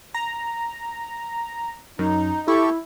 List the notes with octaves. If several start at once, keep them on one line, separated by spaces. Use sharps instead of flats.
A#5
F#2 D#4
E4 G4 A4 C#6